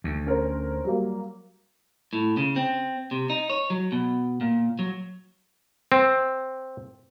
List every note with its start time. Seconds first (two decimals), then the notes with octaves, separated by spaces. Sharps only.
0.04 D2
0.26 C#4 A#4 C5
0.84 F#3 G3 A#3
2.13 A2
2.37 C#3
2.56 C4
3.11 C3
3.30 D#4
3.50 C#5
3.70 F#3
3.92 B2
4.41 A#2
4.79 F#3
5.92 C4